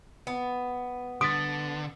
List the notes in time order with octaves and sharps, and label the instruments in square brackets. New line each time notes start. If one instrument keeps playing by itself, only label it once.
[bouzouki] B3
[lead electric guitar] D3 [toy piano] D#6 [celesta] A6 B6 D7